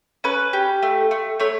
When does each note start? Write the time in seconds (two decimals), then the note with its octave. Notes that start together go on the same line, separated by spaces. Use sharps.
0.24 C#4 B4
0.53 G4
0.83 A3
1.11 A3
1.40 A3 C#5